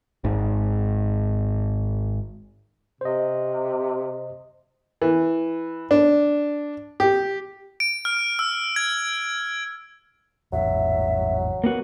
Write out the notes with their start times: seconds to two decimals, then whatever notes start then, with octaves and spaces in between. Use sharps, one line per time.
0.24 G#1 G#2
3.01 C3 C5 D#5
5.02 E3
5.91 D4
7.00 G4
7.80 D7
8.05 F6
8.39 E6
8.76 G#6
10.53 G#1 E2 F#3 E5
11.64 A#3 B3 F#4